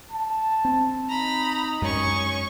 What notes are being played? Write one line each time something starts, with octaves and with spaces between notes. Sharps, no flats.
A5
C4
D#4 A#5 B5
F#2 G#3 C#4 C#6